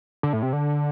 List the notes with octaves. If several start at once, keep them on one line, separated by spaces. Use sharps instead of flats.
D3
A2
C3
D3